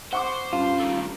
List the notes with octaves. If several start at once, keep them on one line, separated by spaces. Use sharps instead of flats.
C5 F#5 C#6 D6
G2 C#4 F4
D#3 A3